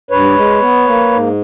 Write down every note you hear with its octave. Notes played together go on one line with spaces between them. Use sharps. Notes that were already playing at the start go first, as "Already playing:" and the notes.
G2 B4 C#5
G#3
B3
A#3
G#2